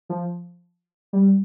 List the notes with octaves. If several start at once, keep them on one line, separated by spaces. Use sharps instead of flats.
F3
G3